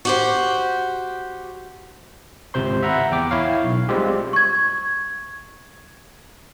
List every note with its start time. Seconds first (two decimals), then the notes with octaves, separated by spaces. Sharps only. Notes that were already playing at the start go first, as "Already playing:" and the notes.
0.05 F#4 G4 C5
2.54 G#1 C#2 C3 C5 C6
2.83 E5 F#5 A#5 B5
3.11 E2 G5 D6
3.31 E4 C#5 F5
3.64 B1
3.89 G3 G#3 C4 F4 G4
4.33 C#6 G#6